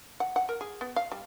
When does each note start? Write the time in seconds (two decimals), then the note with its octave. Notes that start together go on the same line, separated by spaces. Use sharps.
0.20 F#5
0.36 F#5
0.49 A#4
0.61 G#4
0.81 B3
0.96 F5
1.12 G3